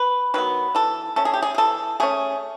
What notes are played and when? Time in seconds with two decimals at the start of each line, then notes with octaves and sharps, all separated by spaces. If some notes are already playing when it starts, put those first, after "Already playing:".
Already playing: B4
0.34 D#3 F#3 B3 B4
0.75 E3 A4
1.16 A3 C#4 A4
1.25 G#4
1.34 G4
1.42 G#4
1.55 G#4
1.58 E3 A4
2.00 A3 C#4 G#4